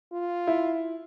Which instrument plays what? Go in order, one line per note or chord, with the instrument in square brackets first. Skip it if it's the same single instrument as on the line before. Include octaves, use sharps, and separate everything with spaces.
[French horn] F4
[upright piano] E4